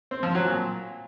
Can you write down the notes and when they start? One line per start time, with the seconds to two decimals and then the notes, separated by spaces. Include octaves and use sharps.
0.11 C4
0.23 F3
0.35 F#3
0.47 A#2